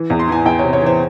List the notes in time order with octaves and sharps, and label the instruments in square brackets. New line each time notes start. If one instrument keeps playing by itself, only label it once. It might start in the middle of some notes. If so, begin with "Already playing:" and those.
Already playing: [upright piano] E3
E2
C6
E3 G#5
E2 G5
C#5
C3
C#5
E3 C5